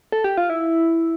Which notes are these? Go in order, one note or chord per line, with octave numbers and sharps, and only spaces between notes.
A4
G4
F4
E4